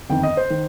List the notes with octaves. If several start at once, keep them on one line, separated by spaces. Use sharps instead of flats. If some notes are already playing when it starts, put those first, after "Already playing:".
G1 F2 D#3 G5
D#5
C5
D#3